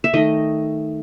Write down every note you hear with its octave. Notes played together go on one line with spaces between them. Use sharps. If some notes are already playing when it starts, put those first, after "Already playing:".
E5
D#3 A3 D#5